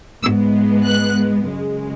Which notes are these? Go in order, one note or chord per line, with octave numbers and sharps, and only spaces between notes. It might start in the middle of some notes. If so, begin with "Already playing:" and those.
G#2 G#3 B3 E6
F#6
F#2 C#3 G#3